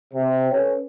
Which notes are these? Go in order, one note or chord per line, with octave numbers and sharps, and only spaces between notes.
C3
C#4 A4 B4 C#5